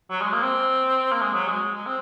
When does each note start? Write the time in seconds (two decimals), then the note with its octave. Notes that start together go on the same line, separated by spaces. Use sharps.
0.10 F#3
0.21 G#3
0.33 A#3
0.43 C4
1.12 A#3
1.21 G#3
1.34 F#3
1.48 G#3
1.74 G#3
1.86 C4